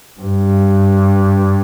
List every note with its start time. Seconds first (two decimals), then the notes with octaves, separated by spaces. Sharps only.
0.21 G2